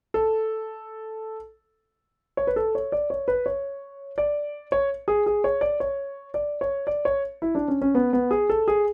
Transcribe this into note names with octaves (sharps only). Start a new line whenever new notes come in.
A4
C#5
B4
A4
C#5
D5
C#5
B4
C#5
D5
C#5
G#4
G#4
C#5
D5
C#5
D5
C#5
D5
C#5
E4
D4
C#4
C#4
B3
B3
G#4
A4
G#4